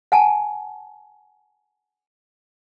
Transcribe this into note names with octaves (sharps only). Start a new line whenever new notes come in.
F#5 G#5 A5